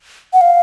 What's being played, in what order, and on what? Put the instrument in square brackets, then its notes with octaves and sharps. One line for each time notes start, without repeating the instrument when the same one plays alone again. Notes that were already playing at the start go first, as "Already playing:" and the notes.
[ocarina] F#5
F5